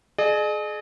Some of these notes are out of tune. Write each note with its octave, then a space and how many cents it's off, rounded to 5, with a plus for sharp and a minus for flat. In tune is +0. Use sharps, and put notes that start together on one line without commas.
G#4 +35 D#5 -45